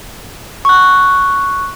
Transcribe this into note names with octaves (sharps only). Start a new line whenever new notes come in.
C#6 F#6